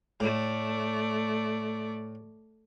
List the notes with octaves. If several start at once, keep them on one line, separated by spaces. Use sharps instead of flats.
A2 A3 D5